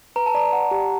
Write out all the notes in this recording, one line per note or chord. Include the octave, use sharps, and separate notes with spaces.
B4 A#5
A5
D5 A#5
F#5
G4